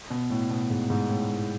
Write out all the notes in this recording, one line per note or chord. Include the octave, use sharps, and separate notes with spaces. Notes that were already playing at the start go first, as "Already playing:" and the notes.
B2
A2
B2
G#2
G#2
A2
A2